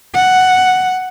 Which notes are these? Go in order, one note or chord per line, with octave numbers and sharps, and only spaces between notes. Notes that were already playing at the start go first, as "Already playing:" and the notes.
F#5